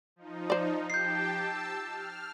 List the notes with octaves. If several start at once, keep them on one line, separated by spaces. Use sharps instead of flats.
F3 D#4
C5 D5
G4 G5 A5 G6 C7
A5 E6
F6